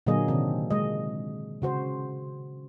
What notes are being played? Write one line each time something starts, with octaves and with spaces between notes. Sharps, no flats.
A#2 D3 F#3 A#3 G#4 D#5
C3 D#3 C4 D4
G#3 D#5
C#3 F#4 C5